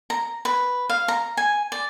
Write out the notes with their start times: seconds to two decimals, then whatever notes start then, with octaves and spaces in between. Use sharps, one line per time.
0.10 A#5
0.45 B4
0.90 F5
1.08 A#5
1.37 G#5
1.72 D5